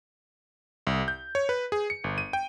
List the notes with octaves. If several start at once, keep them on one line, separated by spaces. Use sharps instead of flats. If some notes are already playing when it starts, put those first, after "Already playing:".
C2
G6
C#5
B4
G#4
C#7
G1
D#7
G5